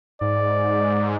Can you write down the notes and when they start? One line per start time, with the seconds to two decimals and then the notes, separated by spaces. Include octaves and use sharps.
0.21 G#2 D5